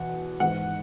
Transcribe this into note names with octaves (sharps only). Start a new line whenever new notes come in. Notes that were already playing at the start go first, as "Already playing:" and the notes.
Already playing: E2 B2 F#5
G#2 E3 F#5